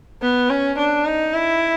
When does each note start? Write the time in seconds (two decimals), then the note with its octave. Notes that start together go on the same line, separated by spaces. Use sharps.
0.22 B3
0.50 C#4
0.78 D4
1.06 D#4
1.34 E4